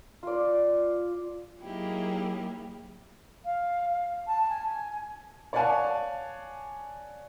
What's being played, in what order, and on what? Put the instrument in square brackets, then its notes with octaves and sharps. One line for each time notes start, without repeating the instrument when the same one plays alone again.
[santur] F4 D5
[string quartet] F#3 A#3 D#4 E4 G4 G#4
[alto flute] F5
A5
G#5
[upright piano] C#5 D5 F5 F#5 G#5 A5